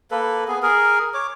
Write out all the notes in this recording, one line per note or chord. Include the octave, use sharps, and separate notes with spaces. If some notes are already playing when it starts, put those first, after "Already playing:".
A#3 A4 B4
B3 G#4
G#4 A#4
C#5 D6